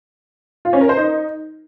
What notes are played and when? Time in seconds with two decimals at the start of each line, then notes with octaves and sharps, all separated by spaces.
0.65 F4
0.73 C#4
0.81 A#4
0.89 C5
0.97 D#4